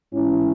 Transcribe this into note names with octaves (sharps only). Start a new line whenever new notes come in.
G#2 E3 C#4 E4